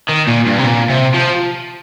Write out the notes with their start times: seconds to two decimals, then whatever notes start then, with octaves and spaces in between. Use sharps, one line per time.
0.09 D#3
0.28 A#2
0.47 G2
0.59 C3
0.65 A#2
0.90 C3
1.14 F3